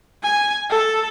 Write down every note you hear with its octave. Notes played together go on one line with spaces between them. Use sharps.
G#5
A4